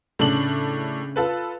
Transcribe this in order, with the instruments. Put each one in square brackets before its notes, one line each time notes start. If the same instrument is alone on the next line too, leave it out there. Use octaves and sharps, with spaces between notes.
[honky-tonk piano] A2 D4 F#7 [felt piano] C#3
[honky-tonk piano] F4 A4 B4